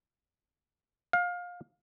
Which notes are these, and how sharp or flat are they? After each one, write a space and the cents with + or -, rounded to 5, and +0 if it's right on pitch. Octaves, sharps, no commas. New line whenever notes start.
F5 +25